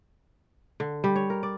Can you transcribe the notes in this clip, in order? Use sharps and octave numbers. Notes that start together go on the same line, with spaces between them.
D3
G3
C#5
A#4
D5